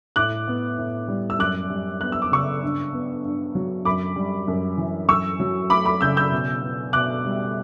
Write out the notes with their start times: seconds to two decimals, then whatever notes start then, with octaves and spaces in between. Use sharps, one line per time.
0.16 A2 D6 F#6
0.48 B3
0.79 A2
1.08 G3
1.30 E6
1.39 F#2 D6 F#6
1.70 G3
2.01 B3 F#6
2.12 E6
2.22 D6
2.31 C#3 C#6 E6
2.63 G2
2.93 B3
3.24 G2
3.55 F#3
3.85 F#2 B5 D6
4.16 G3
4.48 F#2
4.78 E3
5.09 F#2 C#6 E6
5.40 F#3
5.70 A3 B5 D6
5.85 B5 D6
6.01 C#3 E6 G6
6.17 E6 G6
6.31 B2
6.62 B3
6.93 B2 D6 F#6
7.24 G3